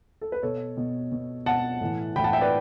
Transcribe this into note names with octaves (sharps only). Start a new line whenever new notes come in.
A4
B4
B2 A4 C#5
B2
B2
B2 F#5 A5
A2 E3
A2 E3 G5 B5
F#5 A5
E5 G5
B4 D5